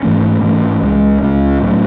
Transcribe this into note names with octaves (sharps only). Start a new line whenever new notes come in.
G#2 E3 A3 C#4
G#2 E3 A3 C#4
C#2 C#3 G#3 C#4
C#2 C#3 G#3 C#4
A2 F#3 A3 C#4